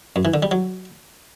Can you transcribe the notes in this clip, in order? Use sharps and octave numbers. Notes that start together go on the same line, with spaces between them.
F#2
E3
D3
G3
F#3